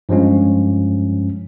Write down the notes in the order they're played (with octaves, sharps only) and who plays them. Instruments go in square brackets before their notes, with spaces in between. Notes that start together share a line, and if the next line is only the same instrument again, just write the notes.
[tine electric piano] G2 F3 G#3 C#4